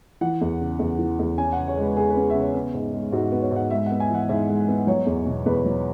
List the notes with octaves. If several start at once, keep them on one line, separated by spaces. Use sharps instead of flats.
E3 F#5
E2
C#3
E2
E3
E2
C#4 G#5
F#5
C#3
C#5
G#3 B4
C#3 G#4
B4
C#4
E5
C#3
C#5
B3
G#2
G#3
G#2 F#4
B3
C#5
G#2
F#5
G#3 E5
F#5
B3
G#5
E3 F#5
G#2 E5
G#3
B3
F#3 C#5
E2
B2
E2 B4
F#3